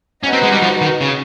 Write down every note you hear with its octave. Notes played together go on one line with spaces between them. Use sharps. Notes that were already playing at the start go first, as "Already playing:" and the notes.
C#4 D#4 F#4 B4
C4
G#3
G3
F3
D#3
C#3